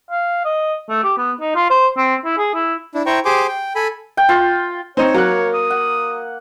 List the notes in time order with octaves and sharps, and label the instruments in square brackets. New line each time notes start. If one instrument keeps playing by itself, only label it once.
[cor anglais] F5
D#5
A3
G4
B3
D#4
F4
C5
C4
E4
G#4
E4
[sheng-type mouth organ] D4 E4
E4 C5 G5 A#5 C#6
G4 G#4 C5 G#5 C6 D6
G5
A4 G#5 B5
[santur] G5
F4
[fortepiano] C4 D#4 [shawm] C#5
[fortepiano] F#3 F#6 [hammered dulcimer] A#3
[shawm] D#6
[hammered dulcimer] F#5